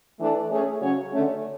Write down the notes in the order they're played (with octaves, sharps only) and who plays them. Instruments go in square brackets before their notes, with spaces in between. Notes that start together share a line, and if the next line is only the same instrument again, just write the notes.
[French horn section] E3 A3 D4 A4
A3 C#4 G#4
C#3 F#3 C#4 F#4 C#5
D3 A3 C#4